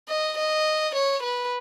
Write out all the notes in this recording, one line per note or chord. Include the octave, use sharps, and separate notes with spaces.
D#5
D#5
C#5
B4